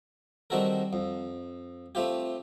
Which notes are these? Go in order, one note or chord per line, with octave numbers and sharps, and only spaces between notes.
D#3 G3 C4 F#4 A4 A#4
F2
A3 C4 F4 G4